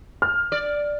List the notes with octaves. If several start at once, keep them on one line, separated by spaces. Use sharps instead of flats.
F6
D5